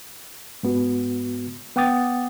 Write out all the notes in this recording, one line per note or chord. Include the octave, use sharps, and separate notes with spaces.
G#2 B3 F#4
B3 F#5 G5 D6 D#6 A6